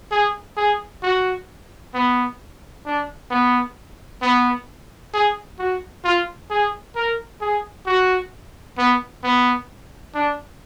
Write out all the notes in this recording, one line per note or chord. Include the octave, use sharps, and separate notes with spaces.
G#4
G#4
F#4
B3
D4
B3
B3
G#4
F#4
F4
G#4
A#4
G#4
F#4
B3
B3
D4